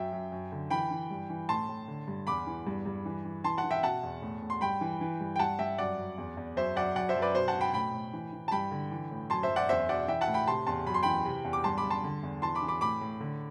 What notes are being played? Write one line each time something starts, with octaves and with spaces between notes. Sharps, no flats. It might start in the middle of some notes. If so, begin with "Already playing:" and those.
Already playing: F#2 E5 G5
F#2
F#2
D3
E3 G5 B5
E3
G2
E3
A2 A5 C6
A2
D3
G2
E2 B5 D6
E3
G2
G2
E3
E3
E3 A5 C6
F#5 A5
E3
E5 G5
B2 F#5 A5
E2
A2
A2
C6
G2 G5 B5
E3
E3
G2
G5
G2 F#5 A5
G2 E5 G5
F#2 D5 F#5
F#2
E2
E2
F#2 C5 E5
F#2 D5 F#5
F#2 D5 F#5
C5 E5
F#2
B4 D5
B2 C5
F#5 A5
B2
G5 B5
A2 G5 B5
A2
E3
E3
A5
G2 G5 B5
D3
E3
A2
F#2 A5 C6
C5 E5
F#2
D5 F#5
E2 C5 E5
B2 D5 F#5
E3 E5 G5
F#5 A5
A2
G5 B5
C3 A5 C6
E2 A5 C6
F#2 B5
C6
E3 G5 B5
C3
E2
D6
G2 A5 C6
B5 D6
G2
A5 C6
D3
E2
E3 A5 C6
B5 D6
E3
B5 D6
A2 B5 D6
A2
D3